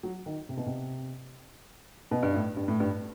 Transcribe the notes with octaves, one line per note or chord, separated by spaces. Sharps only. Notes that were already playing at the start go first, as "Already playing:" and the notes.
F#3
D#3
C3
B2
C3
B2
G2
A2
G2
A2
G2